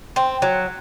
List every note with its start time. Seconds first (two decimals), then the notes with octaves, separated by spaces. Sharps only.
0.16 C4
0.42 F#3